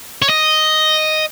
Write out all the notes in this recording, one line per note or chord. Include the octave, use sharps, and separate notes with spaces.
C#5
D#5